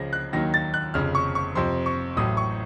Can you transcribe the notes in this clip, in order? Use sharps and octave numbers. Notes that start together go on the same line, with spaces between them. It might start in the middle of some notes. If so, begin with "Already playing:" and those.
Already playing: C#2 C#3 F3 A#6
F#6
D#2 D#3 F#3 A#6
A6
F#6
F1 F2 C#3 F6
C#6
C#6
F2 C3 F3 C6
C#6
A1 A2 F#3 D#6
C#6